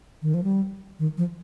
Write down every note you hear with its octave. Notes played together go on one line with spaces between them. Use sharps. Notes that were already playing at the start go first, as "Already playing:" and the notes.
D#3
F3
G3
D#3
F3